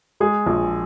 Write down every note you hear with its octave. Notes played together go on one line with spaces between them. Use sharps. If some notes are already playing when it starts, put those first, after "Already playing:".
G#3 G#4
A#1